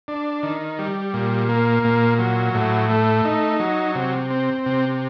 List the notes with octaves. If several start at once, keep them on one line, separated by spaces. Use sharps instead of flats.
D4
D#3
G3
A#2
A#3
A#2
F#3
A2
A3
D#4
F#3
C3
C4
C3